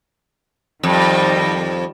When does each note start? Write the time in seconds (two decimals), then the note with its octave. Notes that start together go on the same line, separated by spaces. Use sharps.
0.83 F2 D#3 G3